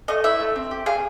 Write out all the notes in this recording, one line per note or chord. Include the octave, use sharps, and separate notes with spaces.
A3 D#5
E4 E5
A3
C4
G4
G#4 F5